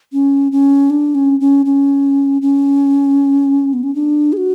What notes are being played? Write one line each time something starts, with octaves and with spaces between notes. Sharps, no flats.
C#4
C#4
D4
C#4
C#4
C#4
C#4
B3
C#4
D4
G#4
F#4